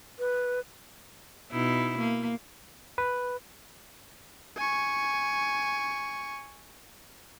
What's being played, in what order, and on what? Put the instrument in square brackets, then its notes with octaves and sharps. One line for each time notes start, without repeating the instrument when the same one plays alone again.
[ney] B4
[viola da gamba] B2 D#4 E4
A#3
[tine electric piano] B4
[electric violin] G#5 C#6